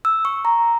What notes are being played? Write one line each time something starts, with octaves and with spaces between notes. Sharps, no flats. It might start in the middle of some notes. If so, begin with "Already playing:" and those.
E6
C#6
A#5